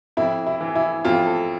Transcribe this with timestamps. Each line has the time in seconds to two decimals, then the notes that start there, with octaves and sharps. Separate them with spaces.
0.17 F2 E4
0.46 E4
0.61 E3
0.75 E4
1.05 F2 F4
1.27 A4